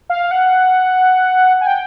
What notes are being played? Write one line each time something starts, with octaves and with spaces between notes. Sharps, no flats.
F5
F#5
G#5
G5